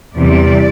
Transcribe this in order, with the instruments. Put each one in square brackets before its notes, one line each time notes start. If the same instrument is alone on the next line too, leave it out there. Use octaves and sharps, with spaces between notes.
[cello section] E2 C3 G3 D5